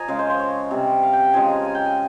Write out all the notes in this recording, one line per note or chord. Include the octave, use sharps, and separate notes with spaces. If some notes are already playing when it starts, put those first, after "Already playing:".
Already playing: F3 D#5 G#5 A#5
C#3 G#3 F5
C5
C5
C#5
C3 G3
F5
G5
C#3 F3 G#3 G#5
A#5
G#5
G5
G#5